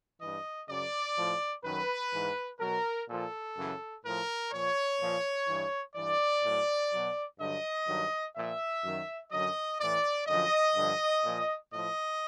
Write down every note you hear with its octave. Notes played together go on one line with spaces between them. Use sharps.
G2 E3 D#5
F#2 C#3 F#3 D5
A2 F3
F#2 D#3 F#3 B4
G#2 E3
B2 F#3 A#4
A#2 F3 A4
F#2 C#3 E3
A2 F3 A#4
A#2 F3 C#5
A#2 F3
G2 E3
G2 E3 D5
A2 F#3
B2 F#3
G2 D3 F#3 D#5
G2 D#3 F#3
A#2 F3 E5
F#2 D#3 F#3
F#2 D3 F#3 D#5
A2 E3 D5
F#2 D3 F3 D#5
G2 D3 F3
A#2 F3
A2 F3 D#5